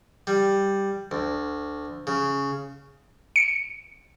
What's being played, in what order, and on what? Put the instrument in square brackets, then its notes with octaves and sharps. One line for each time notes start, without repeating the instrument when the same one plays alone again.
[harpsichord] G3
D2
C#3
[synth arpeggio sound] C#7